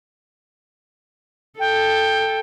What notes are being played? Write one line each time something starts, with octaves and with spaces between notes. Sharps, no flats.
A4 G5